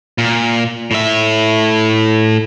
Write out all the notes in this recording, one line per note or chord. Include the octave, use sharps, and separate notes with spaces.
A#2
A2 E5